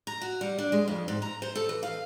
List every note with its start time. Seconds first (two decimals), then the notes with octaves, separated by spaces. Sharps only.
0.07 A#5
0.22 F#4
0.41 G3
0.58 D4
0.72 G#3
0.88 F2
1.08 G#2
1.22 A#5
1.42 C5
1.55 A4
1.69 E3
1.83 F5